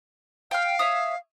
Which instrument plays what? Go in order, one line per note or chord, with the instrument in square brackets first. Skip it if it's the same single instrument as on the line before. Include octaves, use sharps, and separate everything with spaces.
[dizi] F5 [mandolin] G5 F6
[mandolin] C#5 E5 D#6